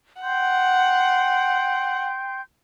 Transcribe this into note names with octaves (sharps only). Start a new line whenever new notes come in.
F#5 G5 C6 G6